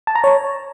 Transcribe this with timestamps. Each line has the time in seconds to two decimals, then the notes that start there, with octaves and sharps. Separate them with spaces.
0.07 A5
0.15 A#5
0.24 C#5